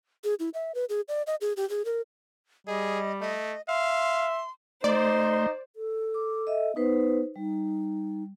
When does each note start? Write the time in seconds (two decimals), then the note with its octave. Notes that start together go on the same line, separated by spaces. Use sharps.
0.24 G#4
0.39 E4
0.54 E5
0.75 B4
0.89 G#4
1.08 D5
1.27 D#5
1.41 G#4
1.57 G4
1.70 G#4
1.85 A#4
2.67 G3 G#4 D#5
3.21 A3 D#5
3.68 E5 F5 C6
4.84 A3 D#4 C5 D5 C6
5.74 A4
6.14 D6
6.47 D#5 E5
6.76 B3 D#4 B4 C5
7.36 G3 D#4